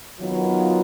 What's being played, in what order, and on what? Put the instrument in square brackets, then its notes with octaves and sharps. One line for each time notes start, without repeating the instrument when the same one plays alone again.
[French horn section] D#3 F#3 B3 F4